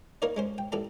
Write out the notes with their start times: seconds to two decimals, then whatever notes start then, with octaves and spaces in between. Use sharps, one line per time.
0.22 A#3 D#4 A#4 C#5 D5
0.36 G#3 C#4 C5
0.58 G5
0.72 A1 A4 D5 A#5